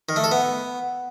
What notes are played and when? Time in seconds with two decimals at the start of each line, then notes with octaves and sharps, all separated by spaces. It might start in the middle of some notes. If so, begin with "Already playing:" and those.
0.09 D#3
0.16 A3
0.24 A4
0.31 B3